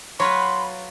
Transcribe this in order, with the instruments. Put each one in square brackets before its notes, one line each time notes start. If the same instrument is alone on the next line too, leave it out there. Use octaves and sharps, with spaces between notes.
[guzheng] F#3 F4 B4 [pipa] C#5 [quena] B5 [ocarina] C6